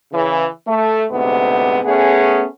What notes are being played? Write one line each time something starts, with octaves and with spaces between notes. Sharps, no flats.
C#3 E3
A3
D2 G#2 C3 B3
A3 B3 C#4 G#4